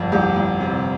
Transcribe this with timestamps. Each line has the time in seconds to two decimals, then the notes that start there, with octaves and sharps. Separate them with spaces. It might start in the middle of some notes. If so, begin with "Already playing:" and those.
Already playing: G1 F2
0.12 C2 G4
0.36 C2
0.60 C3